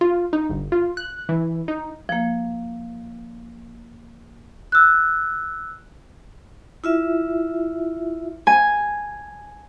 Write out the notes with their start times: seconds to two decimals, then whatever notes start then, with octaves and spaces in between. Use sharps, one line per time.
0.01 F4
0.33 D#4
0.50 G1
0.72 F4
0.97 F#6
1.29 E3
1.68 D#4
2.09 F3 A#3
4.72 E6 F#6
6.84 E4 F4 E5
8.47 G#5